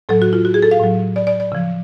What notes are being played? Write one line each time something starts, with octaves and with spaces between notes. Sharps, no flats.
A2 F#3 A4
F#4
F4
F#4
G#4
A4
F5
A2 F#3
D5
D5
D5
C#3 F3